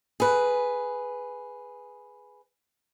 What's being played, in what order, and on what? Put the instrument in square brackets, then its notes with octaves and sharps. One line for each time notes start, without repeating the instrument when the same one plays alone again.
[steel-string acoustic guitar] G#4 B4